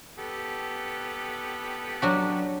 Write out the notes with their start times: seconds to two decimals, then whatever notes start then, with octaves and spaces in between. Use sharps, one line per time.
0.19 B3 G4 A4
2.02 F#3 D4 F#4